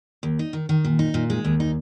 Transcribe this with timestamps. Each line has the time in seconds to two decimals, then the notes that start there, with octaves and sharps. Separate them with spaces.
0.23 D#2
0.39 D#4
0.53 D#3
0.69 D#3
0.84 A#2
0.99 D#4
1.14 A#2
1.30 G#3
1.45 D#2
1.60 D#4